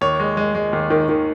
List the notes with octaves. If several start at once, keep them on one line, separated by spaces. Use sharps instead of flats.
D#2 C#5
G#3
G#3
G#3
D#2
D#3
D#3